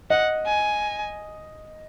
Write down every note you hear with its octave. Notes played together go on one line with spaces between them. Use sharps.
D#5 F#5
G#5